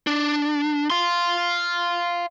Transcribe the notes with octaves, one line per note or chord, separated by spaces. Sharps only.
D4
F5 C6